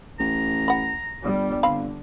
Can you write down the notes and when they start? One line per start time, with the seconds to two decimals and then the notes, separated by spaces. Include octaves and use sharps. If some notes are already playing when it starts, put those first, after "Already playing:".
0.19 A1 A#5
0.68 F#5 B5
1.24 G1 G3
1.63 D3 C4 F5 B5